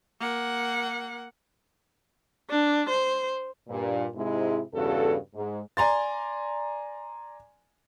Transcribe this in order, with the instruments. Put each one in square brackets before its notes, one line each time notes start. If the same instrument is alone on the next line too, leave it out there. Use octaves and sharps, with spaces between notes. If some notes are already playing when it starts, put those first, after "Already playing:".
[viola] A#3 F#5
D4
C5
[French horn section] G2 A#2
G#2 C3 G#3 E4
E2 G2 C#3 F#4 A4
G#2
[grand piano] D5 G#5 A#5 C6 A6